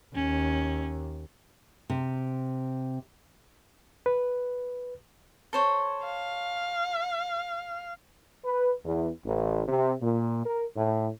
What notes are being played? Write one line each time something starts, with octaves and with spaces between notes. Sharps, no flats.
D#2 C#4
C3
B4
A4 C5 C#5
F5
B4
E2
A1
C3
A#2
A#4
A2